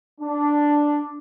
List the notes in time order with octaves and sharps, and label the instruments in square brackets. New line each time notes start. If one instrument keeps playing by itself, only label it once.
[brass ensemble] D4